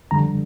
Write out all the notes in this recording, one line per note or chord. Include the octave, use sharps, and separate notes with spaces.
F2 D3 G3 A#5